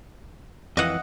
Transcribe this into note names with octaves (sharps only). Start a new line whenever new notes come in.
F2 E3 D#5 F#5